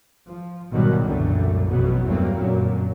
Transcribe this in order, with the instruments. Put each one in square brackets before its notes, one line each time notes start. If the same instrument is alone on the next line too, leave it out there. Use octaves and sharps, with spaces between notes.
[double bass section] F3
G#2 B2 D#3 F#3 G3
C2 F#2 A#2 D3 E3 A3
A1 F2 B2 F#3 B3
E2 G2 F#3 A3 A#3 C4
F#2 A#2 D3 F#3